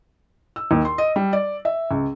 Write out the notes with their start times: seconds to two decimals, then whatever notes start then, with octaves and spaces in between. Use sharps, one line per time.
0.56 E6
0.71 D#2
0.85 C6
0.98 D#5
1.16 G3
1.33 D5
1.65 E5
1.91 C#2